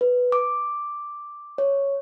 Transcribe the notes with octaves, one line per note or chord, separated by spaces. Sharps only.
B4
D6
C#5